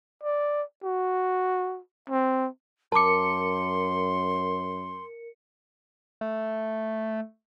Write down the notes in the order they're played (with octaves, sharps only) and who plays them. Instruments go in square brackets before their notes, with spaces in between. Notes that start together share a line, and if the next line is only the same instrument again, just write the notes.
[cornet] D5
F#4
C4
[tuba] F#2 [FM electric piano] A#4 C#7 [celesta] A5 D6 [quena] C6
[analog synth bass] A3